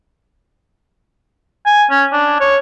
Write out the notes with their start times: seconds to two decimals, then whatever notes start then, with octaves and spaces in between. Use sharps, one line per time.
1.66 G#5
1.90 C#4
2.12 D4
2.40 C#5